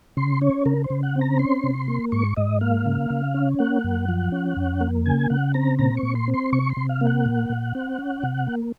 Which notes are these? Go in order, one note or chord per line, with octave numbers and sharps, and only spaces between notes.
C#3 C6
C#4 C#5
C#3 A#4
C5
C#3
F#5
C4
A#5
C#4 C6
C3
A#3
G#2 C#6
G#2 D#5
A#3 F5
C#3
C#3
C#4
A#3 F#5
F#2
F3
C#4
F2
A#3
C#3 G#5
C#3 F#5
C4 A#5
A#2 A#5
C#6
A#2
C6
C4
C6
C3 C#6
C6
C3
F5
A#3
F#5
A#2
A#2
C4
C#4
C3
A#3